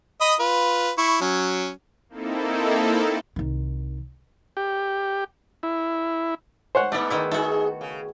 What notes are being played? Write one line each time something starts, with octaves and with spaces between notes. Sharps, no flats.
D#5 B5 D#6
F4 B4
E4 C#6
F#3 C#4
A#3 C4 D#4 E4 A4
C2 D#3
G4
E4
C5 C#5 F#5
G#2 A3 B3 D#4 D5
D#3 B3 E4
D#4 F#4 G#4 A4
C#3